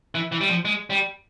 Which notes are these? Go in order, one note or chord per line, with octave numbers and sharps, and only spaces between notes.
E3
E3
G3
F3
G#3
G3